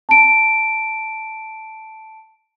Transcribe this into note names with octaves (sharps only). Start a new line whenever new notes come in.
A5 D7